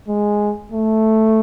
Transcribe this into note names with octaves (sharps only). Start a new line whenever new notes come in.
G#3
A3